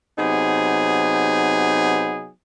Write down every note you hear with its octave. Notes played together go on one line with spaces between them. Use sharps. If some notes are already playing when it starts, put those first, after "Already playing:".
C3 F#3 B3 D#4 G#4